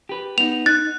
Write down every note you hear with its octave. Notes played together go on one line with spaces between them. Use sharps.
G4 B4
B3 D#4 F7
D#4 F#6 A6